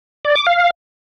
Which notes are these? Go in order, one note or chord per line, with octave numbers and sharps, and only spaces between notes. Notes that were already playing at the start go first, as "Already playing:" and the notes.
D5
D6
F5